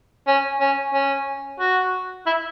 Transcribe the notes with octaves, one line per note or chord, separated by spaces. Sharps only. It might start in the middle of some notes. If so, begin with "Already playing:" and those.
C#4
C#4
C#4
F#4
E4